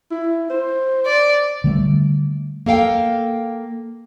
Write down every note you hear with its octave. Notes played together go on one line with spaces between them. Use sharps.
E4
C5
D5
D3 G3 A3
A#3 A4 F5 G5